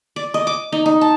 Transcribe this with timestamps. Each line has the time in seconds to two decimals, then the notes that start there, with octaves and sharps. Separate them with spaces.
0.16 D5
0.34 D#5
0.47 D6
0.72 D#4
0.86 D#4
1.01 A5